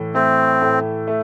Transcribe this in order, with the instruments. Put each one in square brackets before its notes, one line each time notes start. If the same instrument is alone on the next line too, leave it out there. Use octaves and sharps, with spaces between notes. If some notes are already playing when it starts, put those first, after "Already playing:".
Already playing: [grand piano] A2 E3
[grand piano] A3 [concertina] C4
[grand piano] A2
A3